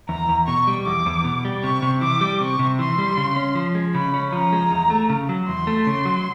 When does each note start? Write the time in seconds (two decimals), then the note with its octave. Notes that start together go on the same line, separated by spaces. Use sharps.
0.09 E2 A#5
0.29 E2
0.47 B2 C#6
0.67 G3
0.86 E2 D6
1.06 E2
1.24 B2
1.45 G3
1.64 C3 C#6
1.82 C3
2.01 E3 D6
2.21 G3
2.40 C3 C#6
2.59 C3
2.79 E3 C6
2.98 G3
3.17 C#3
3.36 C#4
3.55 F3
3.75 G#3
3.94 C#3 B5
4.14 C#4
4.32 F3 A#5
4.52 G#3
4.71 E2
4.90 A3
5.09 C#3
5.29 F#3
5.48 E2 C6
5.67 A3
5.87 C#3
6.05 F#3